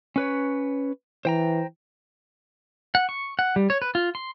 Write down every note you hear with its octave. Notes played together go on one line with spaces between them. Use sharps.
C#4 B4 C#5
E3 C5 G5 A#5
F#5
C#6
F#5
G3
C#5
B4
F4
C6